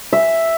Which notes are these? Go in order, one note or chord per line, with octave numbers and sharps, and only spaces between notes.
E5